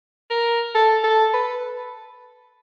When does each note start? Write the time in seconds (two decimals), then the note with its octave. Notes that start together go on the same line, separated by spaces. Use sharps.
0.30 A#4
0.75 A4
1.04 A4
1.34 B4